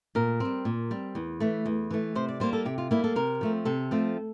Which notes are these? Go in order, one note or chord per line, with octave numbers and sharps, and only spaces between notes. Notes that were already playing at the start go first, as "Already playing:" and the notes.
A#2 A#4
G3 C4
A#2
G3 C4
E2
E3 A3
E2
E3 A3
C3 C5
D5
G3 A#3 C5
A4
C3 G4
F4
G3 A#3 E4
A4
C3 A#4
F3 A3 C4
C3 A4
F3 A3 C4